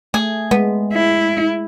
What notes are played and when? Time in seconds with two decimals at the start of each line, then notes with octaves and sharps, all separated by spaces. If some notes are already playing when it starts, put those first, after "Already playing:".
0.14 A3 G#4
0.51 G#3 B3
0.93 E4